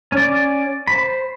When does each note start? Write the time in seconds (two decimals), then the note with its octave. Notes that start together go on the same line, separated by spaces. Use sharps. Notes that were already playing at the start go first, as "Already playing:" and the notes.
0.12 C#4 D5
0.87 C5 B5